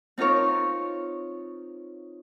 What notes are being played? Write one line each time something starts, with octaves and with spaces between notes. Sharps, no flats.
C4 D#4 F4 A#4 C#5